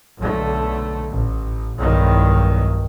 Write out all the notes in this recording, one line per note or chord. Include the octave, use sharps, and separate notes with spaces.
B1 D3 A3
A1 A2
B1 E2 G2 D#3 F#3